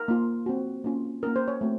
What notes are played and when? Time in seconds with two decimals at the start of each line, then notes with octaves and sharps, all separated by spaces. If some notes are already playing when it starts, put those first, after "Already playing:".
Already playing: A#4
0.08 A#3 F4
0.46 C4 F#4
0.84 A#3 C#4 F4
1.23 A#3 C#4 F4 A#4
1.36 C5
1.48 C#5
1.61 A3 C4 F#4